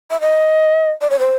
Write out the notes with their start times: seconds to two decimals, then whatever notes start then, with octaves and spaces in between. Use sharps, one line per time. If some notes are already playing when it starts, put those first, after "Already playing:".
0.10 E5
0.21 D#5
1.01 D5
1.10 C#5
1.19 C5